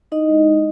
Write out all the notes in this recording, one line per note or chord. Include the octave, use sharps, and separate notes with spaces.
D#4 E4 D#5
G#3
G#3